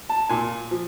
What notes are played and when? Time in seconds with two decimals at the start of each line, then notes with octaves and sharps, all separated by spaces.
0.09 A5
0.29 A#2 G#5
0.71 F3